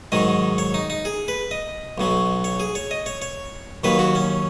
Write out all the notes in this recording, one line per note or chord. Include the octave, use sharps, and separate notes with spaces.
G#2 D#3 F#3 D#5
C#5
D#4
D#4
G#4
B4
D#5
B1 B2 F#3
C#5
G#4
C#5
D#5
C#5
C#5
D#2 D#3 F#3 B4
F#4
C#4